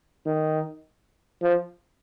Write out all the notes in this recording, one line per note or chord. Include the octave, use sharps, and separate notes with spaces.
D#3
F3